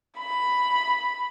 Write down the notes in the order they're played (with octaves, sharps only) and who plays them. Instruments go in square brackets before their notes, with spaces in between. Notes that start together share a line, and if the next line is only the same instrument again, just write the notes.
[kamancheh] B5